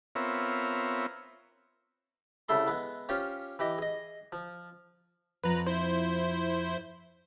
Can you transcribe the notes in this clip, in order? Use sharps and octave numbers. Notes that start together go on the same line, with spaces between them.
B3 C4 F4 A#4 C#5 E5
C2 C#3 A3 E4 A4 C6
G#3 B3
C#4 F4 G4 C5 C#5
E3 G4 D#5
G#4 D#5
F3
F2 F3 C4 B4 A#5
E4 C5